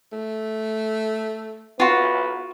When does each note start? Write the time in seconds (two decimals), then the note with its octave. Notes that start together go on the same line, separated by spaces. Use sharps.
0.12 A3
1.80 B3 F4 F#4